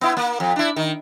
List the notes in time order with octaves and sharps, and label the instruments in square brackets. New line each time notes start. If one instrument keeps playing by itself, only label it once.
[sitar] B3 E4
A#3
F2
D4 E4
D#3